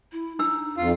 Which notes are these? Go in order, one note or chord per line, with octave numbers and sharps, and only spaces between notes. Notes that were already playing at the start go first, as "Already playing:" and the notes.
E4
D4 D#4 E6
F2 F4